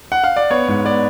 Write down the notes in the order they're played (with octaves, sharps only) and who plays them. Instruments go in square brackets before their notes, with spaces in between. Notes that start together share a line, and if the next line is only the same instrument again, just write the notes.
[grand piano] F#5
F5
D5
B3 C#5
G#2
B3 D5